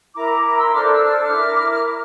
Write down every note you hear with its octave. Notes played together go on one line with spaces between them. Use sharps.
E4 A#4 A#5 D6
A#5 D6
C6 E6
D4 A4 C5 D6 F6
E6
D6 F6
E4 A#4